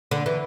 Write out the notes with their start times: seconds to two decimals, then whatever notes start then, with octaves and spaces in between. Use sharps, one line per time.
0.11 D3
0.26 E3